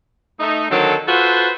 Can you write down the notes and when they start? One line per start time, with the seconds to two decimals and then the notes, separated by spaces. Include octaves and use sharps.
0.39 A3 D#4
0.69 D3 D#3 F#3 C4 A4
1.07 F4 F#4 A4 B4 C5